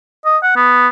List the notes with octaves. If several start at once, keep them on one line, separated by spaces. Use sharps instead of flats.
D#5
F#5
B3